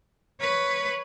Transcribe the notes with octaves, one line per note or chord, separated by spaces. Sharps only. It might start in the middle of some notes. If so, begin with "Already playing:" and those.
B4 C#5